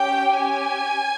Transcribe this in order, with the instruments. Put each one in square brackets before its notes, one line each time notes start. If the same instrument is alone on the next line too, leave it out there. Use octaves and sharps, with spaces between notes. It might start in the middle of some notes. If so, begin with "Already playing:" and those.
Already playing: [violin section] C#4 G4 G5
C#4 G4 G#5